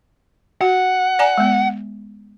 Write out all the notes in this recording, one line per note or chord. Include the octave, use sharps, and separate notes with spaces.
F#4 F#5
D5 G#5 A#5
G#3 B3